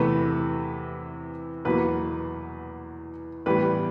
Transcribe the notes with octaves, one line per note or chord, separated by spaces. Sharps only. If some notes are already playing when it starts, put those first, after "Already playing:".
Already playing: E2 C3 E3 A3 B4
E2 B2 F#3 A#3 B4
A2 E3 G3 B3 B4